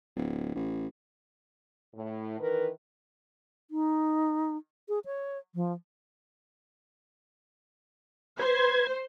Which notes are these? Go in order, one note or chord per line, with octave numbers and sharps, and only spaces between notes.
D1
A1
A2
D#3 E3 A#4 B4
D#4
G#4
C#5
F3
B4 C5 G#6